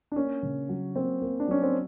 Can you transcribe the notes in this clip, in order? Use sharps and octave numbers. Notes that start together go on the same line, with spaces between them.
D4
A#3 C#4
C#3
F#3
A#3 C4
A#3
D4
F#3 C#4
C4